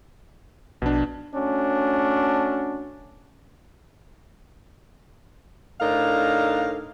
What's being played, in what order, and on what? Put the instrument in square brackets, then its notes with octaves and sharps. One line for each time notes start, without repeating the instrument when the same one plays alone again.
[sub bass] A#1 [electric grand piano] B2 D4
[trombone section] A3 C#4 D4 F#4
[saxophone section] A2 D4 D#4 A#4 F5